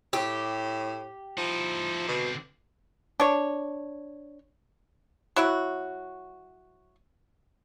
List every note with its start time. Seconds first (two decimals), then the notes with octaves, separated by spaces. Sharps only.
0.13 A2 G4
1.38 F3 D#4 E4
2.09 B2 D3 C4
3.20 D4 C#5
5.36 F#3 E4 F#4